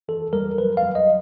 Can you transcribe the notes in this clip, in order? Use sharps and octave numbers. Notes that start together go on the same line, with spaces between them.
E3 A4
G3 A#4
F#3 B4
F5
F#3
D#5